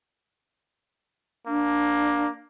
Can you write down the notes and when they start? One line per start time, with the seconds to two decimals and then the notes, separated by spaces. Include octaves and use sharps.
1.47 A#3 D4